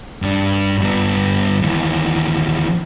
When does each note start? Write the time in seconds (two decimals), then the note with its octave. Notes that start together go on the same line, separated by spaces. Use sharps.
0.22 G2 D4
0.82 G2 B3
1.62 D#2 E3